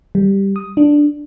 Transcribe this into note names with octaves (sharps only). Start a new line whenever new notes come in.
G3
D#6
D4